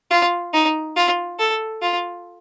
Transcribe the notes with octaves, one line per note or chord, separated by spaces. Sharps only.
F4
D#4
F4
A4
F4